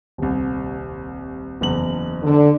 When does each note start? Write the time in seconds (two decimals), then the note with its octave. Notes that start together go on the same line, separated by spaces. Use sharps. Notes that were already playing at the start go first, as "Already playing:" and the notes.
0.18 D#1 C2
1.61 F#1 E2 F#7
2.23 D3